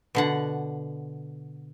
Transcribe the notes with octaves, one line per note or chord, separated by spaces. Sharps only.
B2 D3 F#5